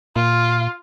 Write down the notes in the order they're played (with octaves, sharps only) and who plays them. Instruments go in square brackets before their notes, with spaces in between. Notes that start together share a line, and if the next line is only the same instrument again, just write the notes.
[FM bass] A#2 [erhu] F4